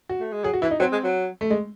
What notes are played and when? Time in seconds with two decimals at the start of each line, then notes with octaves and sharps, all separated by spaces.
0.09 F#4
0.20 A3
0.32 G#3
0.44 F#3 G#4
0.54 F#4
0.62 E3 E4
0.71 D#4
0.80 F#3 C4
0.92 G#3
1.03 F#3
1.41 A3
1.50 G#3